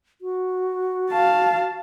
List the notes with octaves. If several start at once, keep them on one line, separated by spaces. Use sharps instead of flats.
F#4
F5 A5